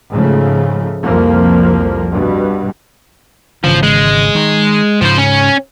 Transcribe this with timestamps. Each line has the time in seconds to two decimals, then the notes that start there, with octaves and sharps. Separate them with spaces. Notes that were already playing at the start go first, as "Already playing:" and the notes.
0.11 G#2 C#3 F3 A3
1.03 C2 F2 F3 A#3
2.12 G2 B2
3.64 G#1 C#3 E3 F3
3.83 G#3
4.35 D#3
5.02 G#2 C#3 F3 C5
5.18 C#4